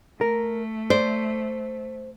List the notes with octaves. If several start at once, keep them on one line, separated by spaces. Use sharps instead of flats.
A3 A#4
C5 D5